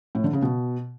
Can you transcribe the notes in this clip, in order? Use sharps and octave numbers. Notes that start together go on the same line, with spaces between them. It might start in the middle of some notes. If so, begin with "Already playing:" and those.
A2
D3
C#3
B2